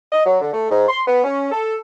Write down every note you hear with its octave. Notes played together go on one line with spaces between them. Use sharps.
D#5
F#3
D3
A3
G#2
C6
B3
C#4
A4